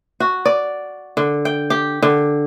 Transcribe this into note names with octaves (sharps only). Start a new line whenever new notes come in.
F#4
D5
D3
G5
G4
D3